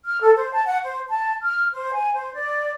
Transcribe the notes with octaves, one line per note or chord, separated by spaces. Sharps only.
F6
A4
C5
A5
F#5
C5
A5
F6
C5
G#5
C5
D5